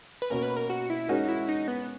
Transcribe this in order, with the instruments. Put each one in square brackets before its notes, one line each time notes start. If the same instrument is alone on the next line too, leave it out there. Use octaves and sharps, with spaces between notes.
[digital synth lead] B4
[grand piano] B2 A#3 C#4 [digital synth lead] A#4
[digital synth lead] B4
A#4
F#4
E4
[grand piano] G#3 C#4 F#4 A#4 [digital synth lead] D#4
[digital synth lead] E4
D#4
B3